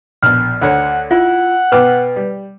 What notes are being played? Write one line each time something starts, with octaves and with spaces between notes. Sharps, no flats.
A#1 B2 F6
D2 D3 C#5 F#5
E4 F4 F#5
B2 B4 G5 D6 F6
G3